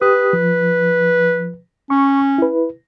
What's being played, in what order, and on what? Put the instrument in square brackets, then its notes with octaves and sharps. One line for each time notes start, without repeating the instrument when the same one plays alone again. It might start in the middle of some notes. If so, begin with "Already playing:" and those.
[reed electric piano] G4 D#6 [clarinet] B4
[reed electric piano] F3
[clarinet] C#4 [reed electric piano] C#6
[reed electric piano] E4 B4